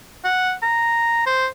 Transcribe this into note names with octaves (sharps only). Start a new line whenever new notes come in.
F#5
A#5
C5